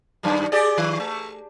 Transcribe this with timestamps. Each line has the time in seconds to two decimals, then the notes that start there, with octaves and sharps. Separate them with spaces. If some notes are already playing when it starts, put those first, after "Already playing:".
0.23 F#2 D#3 G3
0.52 G4 G#4 D5
0.78 D#3
1.00 A3